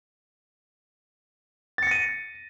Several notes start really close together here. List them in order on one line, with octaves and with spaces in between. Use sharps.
A6 C#7 A#6 D#7